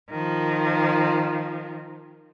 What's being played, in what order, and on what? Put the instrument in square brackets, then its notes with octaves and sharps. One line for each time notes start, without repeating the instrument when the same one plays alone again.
[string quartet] D#3 F3